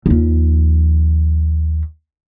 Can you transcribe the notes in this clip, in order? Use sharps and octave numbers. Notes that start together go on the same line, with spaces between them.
D#2 F3